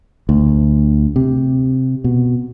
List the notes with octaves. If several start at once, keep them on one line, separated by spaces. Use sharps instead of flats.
D2
C3
B2